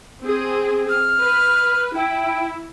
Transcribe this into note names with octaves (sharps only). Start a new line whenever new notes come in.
C4 G#4
F6
B4
E4 G5